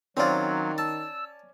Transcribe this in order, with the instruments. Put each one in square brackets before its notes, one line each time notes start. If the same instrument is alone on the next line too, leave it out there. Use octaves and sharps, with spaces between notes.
[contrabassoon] D#3 [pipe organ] F#3 [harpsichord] C4 F4 [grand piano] C#4 D5
[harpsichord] A5 [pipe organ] E6